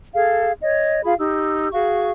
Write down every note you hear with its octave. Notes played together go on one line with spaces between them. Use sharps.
G#4 A4 F5
C#5 D#5
F4 G#4 F5 B5
D#4 G4 E6
F#4 G#4 F5 C#6